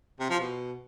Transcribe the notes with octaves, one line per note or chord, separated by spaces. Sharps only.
C3
F3
B2